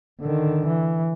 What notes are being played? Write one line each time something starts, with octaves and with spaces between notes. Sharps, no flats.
D3 D#3
E3